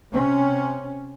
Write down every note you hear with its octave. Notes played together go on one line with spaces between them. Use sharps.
C3 C#4